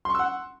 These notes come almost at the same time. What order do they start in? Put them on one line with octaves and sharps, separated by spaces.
C6 C#6 E6 F#5